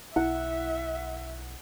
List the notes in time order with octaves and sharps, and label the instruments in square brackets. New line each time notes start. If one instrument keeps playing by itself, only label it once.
[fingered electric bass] B1 [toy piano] E4 [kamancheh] E5 [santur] F#5